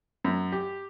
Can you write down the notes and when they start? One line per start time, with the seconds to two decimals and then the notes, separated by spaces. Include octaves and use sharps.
0.24 F#2
0.52 G4